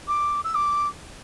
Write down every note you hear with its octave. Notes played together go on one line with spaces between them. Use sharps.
D6
E6
D6